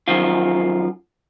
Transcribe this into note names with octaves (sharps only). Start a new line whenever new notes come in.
F#2 D#3 F3 F4